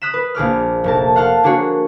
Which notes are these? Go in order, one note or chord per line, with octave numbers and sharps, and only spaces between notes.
D#6 F#6 B6 E7
B4
A#1 G#4 D5 F6
F1 A#4 A5
F5 F#5 A5 C6 F6
A#3 D4 F#4 G#4 C#5